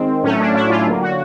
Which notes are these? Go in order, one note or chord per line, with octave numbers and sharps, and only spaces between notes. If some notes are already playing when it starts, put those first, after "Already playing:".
Already playing: D#3 G#3 C4
A2 F#3 A3 C#4
D4
E4
F4
D3 F#3 A#3
F#4